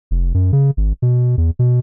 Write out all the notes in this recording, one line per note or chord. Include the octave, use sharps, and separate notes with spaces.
F1
F#2
C#3
G#1
B2
E2
B2